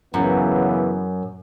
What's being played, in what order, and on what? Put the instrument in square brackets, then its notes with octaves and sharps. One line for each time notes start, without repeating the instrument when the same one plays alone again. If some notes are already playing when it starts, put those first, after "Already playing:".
[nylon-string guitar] F#2 [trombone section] C#3 E3 B3